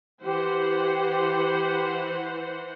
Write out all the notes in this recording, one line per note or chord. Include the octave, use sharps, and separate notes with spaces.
E3 G4 C5 F#5